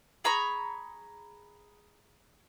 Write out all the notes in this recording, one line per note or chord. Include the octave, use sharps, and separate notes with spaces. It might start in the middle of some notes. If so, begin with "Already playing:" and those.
G#4 A#5 B5 C#6